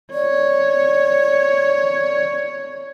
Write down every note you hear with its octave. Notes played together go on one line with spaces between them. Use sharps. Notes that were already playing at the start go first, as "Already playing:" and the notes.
C#5 D5